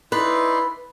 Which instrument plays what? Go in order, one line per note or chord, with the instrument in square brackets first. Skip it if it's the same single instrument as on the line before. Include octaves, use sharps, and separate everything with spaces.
[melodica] D#4 D5 C6 [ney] E4 [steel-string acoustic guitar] B4